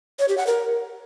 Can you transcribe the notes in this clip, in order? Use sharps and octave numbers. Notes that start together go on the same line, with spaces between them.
C#5
G4
F#5
A#4